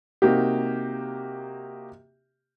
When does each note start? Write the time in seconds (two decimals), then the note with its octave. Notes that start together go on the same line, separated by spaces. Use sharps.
0.22 C3 A#3 D#4 F#4 G4